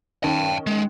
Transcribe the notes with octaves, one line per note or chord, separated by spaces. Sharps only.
D#3 C#4 G5 A5
G#3